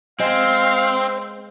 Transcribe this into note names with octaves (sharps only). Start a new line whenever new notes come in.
G#3 C4 C5 F5